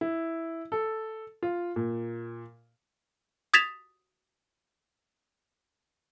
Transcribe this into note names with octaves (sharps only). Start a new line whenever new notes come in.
E4
A4
F4
A#2
D#6 G#6 A6 B6 E7 F7